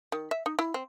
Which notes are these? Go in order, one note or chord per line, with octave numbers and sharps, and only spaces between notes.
D#3
E5
D#4
E4
C4